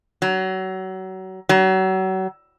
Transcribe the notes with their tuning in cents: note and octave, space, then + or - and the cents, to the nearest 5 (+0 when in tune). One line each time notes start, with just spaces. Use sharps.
F#3 +30
F#3 +35